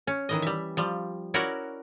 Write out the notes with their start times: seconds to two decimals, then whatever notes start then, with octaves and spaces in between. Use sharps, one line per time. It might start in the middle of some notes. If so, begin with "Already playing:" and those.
0.07 C#4
0.29 D#3 E3 D#5
0.42 G3 E5
0.77 F3 G3
1.34 C#4 E4 F#4 A#4 D5